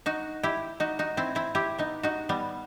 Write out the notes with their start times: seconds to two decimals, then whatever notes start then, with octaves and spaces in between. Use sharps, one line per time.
0.06 D#4 F#4
0.43 E4 G4
0.80 D#4 F#4
0.99 D#4 F#4
1.17 C4 E4
1.35 C4 E4
1.55 E4 G4
1.79 B3 D#4
2.03 D#4 F#4
2.29 G3 B3